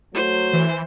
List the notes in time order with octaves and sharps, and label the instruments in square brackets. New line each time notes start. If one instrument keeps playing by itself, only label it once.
[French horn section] F#3 A3 [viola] C5
[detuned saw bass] E3